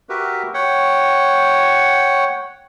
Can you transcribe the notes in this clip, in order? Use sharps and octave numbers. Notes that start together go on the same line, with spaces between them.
F#4 G4 A#4 B4 E5
C#5 F#5 G5